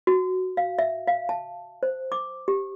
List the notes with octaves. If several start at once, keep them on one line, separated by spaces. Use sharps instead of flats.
F#4
F5
E5
F5
A5
C5
D6
G4